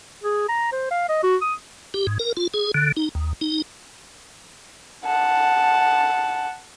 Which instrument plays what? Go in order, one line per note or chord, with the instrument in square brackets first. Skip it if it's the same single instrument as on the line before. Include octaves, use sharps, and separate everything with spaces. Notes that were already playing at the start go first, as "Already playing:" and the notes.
[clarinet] G#4
A#5
C5
F5
D#5
F#4
D#6
[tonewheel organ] G4
G#2
A#4
F4
G#4
D3
D#4
D#2
D#4
[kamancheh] F#5 A5